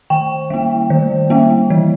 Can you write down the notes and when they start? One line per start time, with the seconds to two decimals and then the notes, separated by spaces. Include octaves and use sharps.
0.10 D#3 G5
0.50 G3 A#3
0.90 D#3
1.30 G3 A#3
1.70 E3